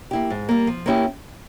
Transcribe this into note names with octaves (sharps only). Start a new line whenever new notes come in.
A#3 E4 G4
G#2
G3 A#3
F3
A#3 C#4 E4 G4